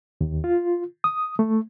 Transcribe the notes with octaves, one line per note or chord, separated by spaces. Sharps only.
D#2
F4
D#6
A3